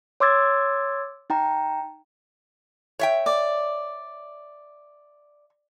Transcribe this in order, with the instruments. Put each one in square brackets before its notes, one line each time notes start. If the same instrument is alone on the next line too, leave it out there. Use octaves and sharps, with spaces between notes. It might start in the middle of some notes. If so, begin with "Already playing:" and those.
[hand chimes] C#5 C6 D6 E6 G#6 A6
D#4 G5 A#5
[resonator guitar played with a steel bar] C#5 E5 G5
[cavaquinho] D5